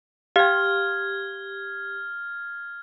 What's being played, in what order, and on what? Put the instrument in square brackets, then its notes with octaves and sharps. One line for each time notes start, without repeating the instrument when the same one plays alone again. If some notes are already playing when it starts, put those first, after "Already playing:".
[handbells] G4 [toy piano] F5 G5 [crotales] F6 G#6